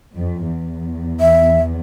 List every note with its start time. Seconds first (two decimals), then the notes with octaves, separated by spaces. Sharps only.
0.16 F2
0.51 E2
1.20 E5